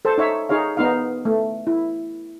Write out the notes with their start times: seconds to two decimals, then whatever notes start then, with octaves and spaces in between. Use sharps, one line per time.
0.05 A4 C5 A5
0.18 D#4 C#5 E5
0.49 D#4 G#4 C#5 F5
0.77 B3 D#4 F5
1.25 A3
1.67 E4